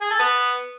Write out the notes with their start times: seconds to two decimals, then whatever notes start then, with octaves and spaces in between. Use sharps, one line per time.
0.01 G#4
0.10 A4
0.19 B3